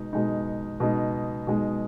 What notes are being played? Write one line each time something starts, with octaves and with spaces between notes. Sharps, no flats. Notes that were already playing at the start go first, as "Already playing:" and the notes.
Already playing: B2 G#3 D#4
B2 G#3 D#4
B2 G#3 D#4
B2 G#3 D#4